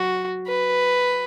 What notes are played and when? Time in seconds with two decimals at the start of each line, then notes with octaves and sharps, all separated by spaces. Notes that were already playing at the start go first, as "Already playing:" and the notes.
Already playing: F#3 F#4
0.48 B4